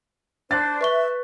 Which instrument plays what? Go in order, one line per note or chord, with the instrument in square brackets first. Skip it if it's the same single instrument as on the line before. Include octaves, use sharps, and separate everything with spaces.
[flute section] D4 C5 [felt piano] F#6 A6
[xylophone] B4 C#6 G7 [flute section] E5